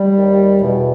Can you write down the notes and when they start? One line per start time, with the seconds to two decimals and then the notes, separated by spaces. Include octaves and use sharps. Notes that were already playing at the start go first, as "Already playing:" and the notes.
Already playing: G3
0.17 D#2 D#3
0.62 E2 B2